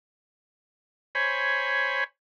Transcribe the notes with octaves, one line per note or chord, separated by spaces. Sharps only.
C5 C#5 G#5 B5